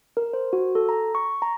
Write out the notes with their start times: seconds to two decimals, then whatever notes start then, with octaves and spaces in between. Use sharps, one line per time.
0.17 A#4
0.33 C5
0.53 F#4
0.75 A4
0.89 A#5
1.15 C#6
1.42 A#5